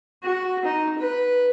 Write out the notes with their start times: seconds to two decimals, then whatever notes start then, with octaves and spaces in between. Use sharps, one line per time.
0.23 F#4
0.65 D#4
0.99 B4